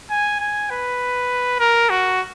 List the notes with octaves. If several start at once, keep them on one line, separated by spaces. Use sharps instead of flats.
G#5
G#5
B4
A#4
F#4